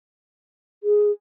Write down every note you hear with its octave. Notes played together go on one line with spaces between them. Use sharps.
G#4